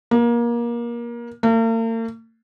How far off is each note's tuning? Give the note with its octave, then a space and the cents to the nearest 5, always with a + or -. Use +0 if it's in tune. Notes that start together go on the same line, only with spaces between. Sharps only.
A#3 +25
A#3 -45